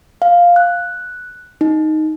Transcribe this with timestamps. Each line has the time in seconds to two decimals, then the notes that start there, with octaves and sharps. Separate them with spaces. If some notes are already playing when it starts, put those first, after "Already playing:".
0.22 F5
0.56 F#6
1.61 D#4